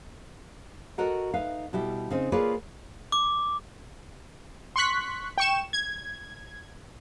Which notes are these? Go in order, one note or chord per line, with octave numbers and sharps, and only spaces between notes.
F#4 A4 A#4 D#5 F#5
D#4 B4 E5 F5
B2 G3 E4 G4
C#3 C4 D#4
A#3 F4 G#4 B4 C#5 D5
D6
C6 C#6 F#6 B6
G5 C#6 E7
G#6